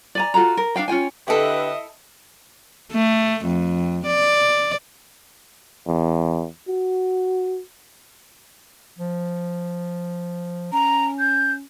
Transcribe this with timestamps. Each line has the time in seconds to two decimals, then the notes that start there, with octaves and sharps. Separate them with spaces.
0.15 D5 G#5 A#5
0.34 F4 F#4 A4 A#5
0.57 A#4
0.76 D4 A4 F5 G5
0.88 C#4 F4 G5 G#5
1.28 D3 E4 G4 A4 B4 D#5 E5
2.93 A3
3.46 F2
4.07 D5
5.87 E2
6.68 F#4
8.99 F3
10.73 C#4 A#5
11.19 G6